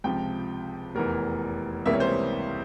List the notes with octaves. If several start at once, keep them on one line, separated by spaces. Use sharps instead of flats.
C#2 C3 F3 G5
F1 E2 E3 A#4
C#2 C3 E3 G3 A#3 E5
C#5
C5
C#5